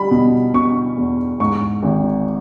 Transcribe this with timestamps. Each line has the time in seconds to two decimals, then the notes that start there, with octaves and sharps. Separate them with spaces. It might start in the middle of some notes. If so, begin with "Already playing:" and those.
Already playing: G3 B5
0.11 B2
0.54 B2 C#6
0.97 E2
1.40 G#2 C#6
1.83 G#1